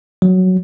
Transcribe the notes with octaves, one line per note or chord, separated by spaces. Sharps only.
F#3